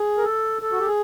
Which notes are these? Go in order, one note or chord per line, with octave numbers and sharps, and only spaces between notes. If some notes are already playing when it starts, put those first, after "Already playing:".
Already playing: G#4
A#4
A4
A4
F#4
G4
G#4